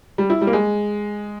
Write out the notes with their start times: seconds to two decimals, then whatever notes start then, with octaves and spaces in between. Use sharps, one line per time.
0.18 G3
0.30 E4
0.41 G3
0.47 A#3
0.53 G#3